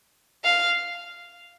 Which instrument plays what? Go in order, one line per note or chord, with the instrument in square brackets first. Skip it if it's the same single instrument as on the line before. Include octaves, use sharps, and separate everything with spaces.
[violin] F5